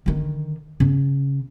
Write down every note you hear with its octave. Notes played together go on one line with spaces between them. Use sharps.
D3 D#3
C#3